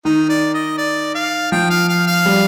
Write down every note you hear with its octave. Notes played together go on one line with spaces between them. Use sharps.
D#3 D#4
D5
D#5
D5
F5
F3 G5
F5
F5
F5
G3